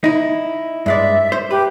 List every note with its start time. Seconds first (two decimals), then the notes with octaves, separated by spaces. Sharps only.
0.04 D#4 E4
0.86 G2 G#3 D5 E5
1.32 C5
1.51 G4 B4